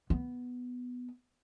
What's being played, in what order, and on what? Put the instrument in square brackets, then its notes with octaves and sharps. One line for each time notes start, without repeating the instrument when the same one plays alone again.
[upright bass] B3